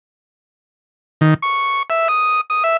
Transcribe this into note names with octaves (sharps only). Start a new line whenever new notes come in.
D#3
C#6
E5
D#6
D#6
E5